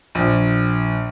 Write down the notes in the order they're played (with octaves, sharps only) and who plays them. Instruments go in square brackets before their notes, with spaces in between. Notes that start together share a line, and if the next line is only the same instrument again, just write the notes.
[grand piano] A#1